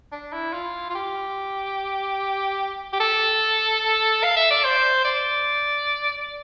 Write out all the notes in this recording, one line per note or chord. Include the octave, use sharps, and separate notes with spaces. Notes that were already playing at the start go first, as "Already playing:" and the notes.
D4
E4
F4
F4
G4
G4
A4
F5
E5
D5
C5
D5